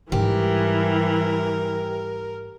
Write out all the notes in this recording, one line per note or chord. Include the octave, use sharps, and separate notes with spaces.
G#2 E3 G3 G4 A#4